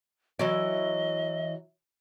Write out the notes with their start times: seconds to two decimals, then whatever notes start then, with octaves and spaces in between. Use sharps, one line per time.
0.39 E3 F#3 D5 D#5